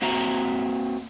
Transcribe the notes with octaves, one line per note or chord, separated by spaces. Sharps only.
A#3 C4 F#4 E5 A#5